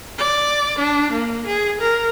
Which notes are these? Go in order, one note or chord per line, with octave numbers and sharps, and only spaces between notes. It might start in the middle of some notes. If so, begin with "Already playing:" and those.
D5
D4
A#3
G#4
A#4